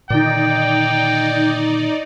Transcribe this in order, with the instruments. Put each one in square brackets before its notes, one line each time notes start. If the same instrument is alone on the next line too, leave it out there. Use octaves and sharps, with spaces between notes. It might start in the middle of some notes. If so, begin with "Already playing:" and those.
[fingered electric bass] A#2 D3 D#3 [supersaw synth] D#4 D5 [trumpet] G5